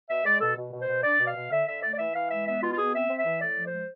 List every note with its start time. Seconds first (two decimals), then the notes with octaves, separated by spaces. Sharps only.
0.09 B2 E5
0.24 G#3 D5
0.40 B2 A4
0.56 B2
0.72 B2
0.80 C5
0.88 B2
1.03 D4 D5
1.19 B2
1.27 F5
1.35 B2
1.51 D3 E5
1.67 D3 E5
1.82 A3 D5
1.93 D5
1.98 E3 E5
2.14 E3 F5
2.30 G#3 E5
2.46 B3 E5
2.62 B2 F4
2.73 F4
2.78 B3 G#4
2.93 C4 E5
3.09 C4
3.18 E5
3.25 E3
3.42 A2 D5
3.56 F3
3.65 C5
3.72 G#3